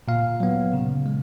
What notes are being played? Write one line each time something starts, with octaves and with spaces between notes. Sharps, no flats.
A#2 F5
F#3 B3
C#3
G#3